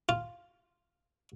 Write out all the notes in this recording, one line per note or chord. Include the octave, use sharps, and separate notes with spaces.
F4